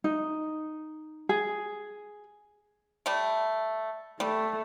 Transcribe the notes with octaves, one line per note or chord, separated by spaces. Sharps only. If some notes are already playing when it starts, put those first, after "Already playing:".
D#4
G#4
G3 A3
G3 A3